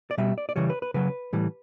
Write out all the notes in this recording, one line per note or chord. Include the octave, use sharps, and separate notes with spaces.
D5
B2 G3 E5
D5
D5
C#3 E3 G3 C#5
B4
B4
C#3 F#3 B4
A2 E3 G3